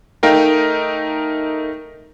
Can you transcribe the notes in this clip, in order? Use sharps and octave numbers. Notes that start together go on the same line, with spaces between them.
A3 D#4 A#4 F5 G5